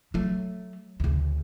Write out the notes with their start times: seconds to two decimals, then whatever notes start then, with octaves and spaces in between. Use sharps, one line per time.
0.14 F#3 A3
1.00 D2 C#3